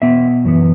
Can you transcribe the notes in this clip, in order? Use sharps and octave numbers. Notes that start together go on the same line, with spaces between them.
B2 B3 E5
F#2 E3 B3